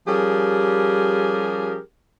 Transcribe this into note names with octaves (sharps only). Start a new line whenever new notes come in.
F3 G3 C#4 G4 G#4 A#4